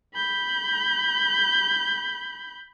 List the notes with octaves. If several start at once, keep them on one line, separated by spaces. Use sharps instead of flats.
B5 G6